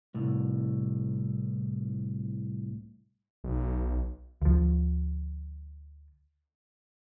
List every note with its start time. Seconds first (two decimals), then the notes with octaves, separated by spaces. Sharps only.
0.14 C2 A2
3.44 B1
4.42 D2 F3